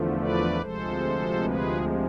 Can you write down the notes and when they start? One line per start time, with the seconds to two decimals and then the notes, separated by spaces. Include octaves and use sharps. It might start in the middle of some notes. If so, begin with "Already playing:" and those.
Already playing: E2 D3 F3 A3
0.19 B4 D5
0.60 D2 C3 F3 G#3 A4 C5
1.41 G#4 B4